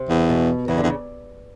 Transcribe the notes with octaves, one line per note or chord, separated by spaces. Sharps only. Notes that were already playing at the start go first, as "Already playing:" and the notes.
Already playing: C3
E2
B2
E2 C#3
D3
E2
C#3